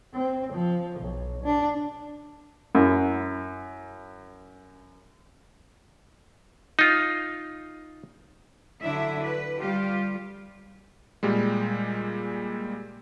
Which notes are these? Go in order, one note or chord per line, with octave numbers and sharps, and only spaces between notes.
C4
F3
B1
D4
F#2 E4
D#4 F4
D3 F#3 D4 E4 E5
B4
G3 F4 G4
A#2 G3 G#3